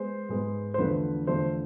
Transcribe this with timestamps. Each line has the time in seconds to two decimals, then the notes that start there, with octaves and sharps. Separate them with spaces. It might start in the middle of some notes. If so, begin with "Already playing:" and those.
Already playing: G#3 B3 C5
0.29 G#2 G#3 B3
0.74 C5
0.78 E2 D3 F3 A3 B4
1.27 E2 D3 F3 A3 C5